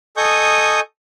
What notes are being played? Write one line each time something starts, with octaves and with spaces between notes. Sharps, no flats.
A4 D#5 G#5 C#6 D#6 G6